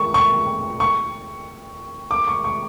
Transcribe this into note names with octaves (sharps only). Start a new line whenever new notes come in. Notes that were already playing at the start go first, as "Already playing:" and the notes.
Already playing: C#6
C#6
C#6
D6
C#6
C#6